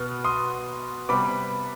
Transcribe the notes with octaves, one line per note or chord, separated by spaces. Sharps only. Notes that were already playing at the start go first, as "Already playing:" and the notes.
Already playing: B2 B3 F6
C6 D#6
C3 G3 B3 B5 D6